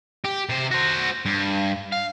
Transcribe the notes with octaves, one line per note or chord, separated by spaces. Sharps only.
G4
C3 C5
F#4 C5
G2
F5